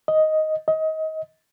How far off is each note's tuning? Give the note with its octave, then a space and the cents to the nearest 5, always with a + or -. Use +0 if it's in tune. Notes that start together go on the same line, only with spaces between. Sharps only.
D#5 +5
D#5 +25